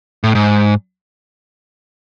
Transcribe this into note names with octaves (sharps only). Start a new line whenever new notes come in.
A2
G#2